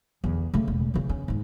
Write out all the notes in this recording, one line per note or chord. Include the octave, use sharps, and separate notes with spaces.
E2 D3
C#3 A3
E1
C#3 E3
C#4
G#2 D#4